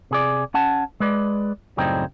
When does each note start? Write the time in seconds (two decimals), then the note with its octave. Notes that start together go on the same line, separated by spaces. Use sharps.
0.11 C3 G#4 D5
0.54 C#4 F#5 A5
1.00 G#3 B4 D5
1.77 F#2 A2 C#3 G3 C4 D#4